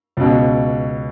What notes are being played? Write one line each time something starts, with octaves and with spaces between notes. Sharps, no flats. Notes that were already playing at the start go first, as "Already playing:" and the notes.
C#2 B2